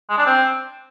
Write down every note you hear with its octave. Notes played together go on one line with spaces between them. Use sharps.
G#3
D4
C4